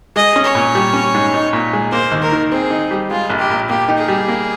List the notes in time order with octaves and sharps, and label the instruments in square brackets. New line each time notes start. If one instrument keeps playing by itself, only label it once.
[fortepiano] G#3 [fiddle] D#5
[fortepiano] C#4
[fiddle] C#5
[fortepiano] A#2
G3
C#4
G#2
D#4
A#2
G#3
[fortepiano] A#3 [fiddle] C5
[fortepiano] D#2
[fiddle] A#4
[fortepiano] D#3
[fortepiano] C4 [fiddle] G#4
[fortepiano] D#4
G3
[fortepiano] G#3 [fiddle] F4
[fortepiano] A#1
[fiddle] G4
[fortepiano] A#2
[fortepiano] A#3 [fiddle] G4
[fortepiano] D#4
[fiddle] G#4
[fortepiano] G3
A#3